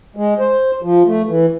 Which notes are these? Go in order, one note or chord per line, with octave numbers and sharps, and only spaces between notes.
G#3
C5
F3
A3
E3